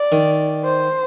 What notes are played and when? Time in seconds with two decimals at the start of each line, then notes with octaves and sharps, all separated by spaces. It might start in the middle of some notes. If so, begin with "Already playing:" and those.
Already playing: D5
0.12 D#3
0.64 C5